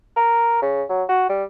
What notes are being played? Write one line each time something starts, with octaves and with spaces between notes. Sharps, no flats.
A#4
C#3
F#3
F#4
G3